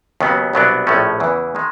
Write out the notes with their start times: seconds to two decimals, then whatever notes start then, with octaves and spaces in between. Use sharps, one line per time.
0.21 D#2 C#3 F#3 B3
0.53 C2 B2 F#3 B3 D4
0.87 A#1 A2 F3 A3 C#4
1.20 E2 C#3 E3
1.55 D#3 G#3